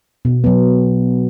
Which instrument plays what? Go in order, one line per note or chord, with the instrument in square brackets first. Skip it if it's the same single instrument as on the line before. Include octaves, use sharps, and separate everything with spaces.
[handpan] B2
F#3 B3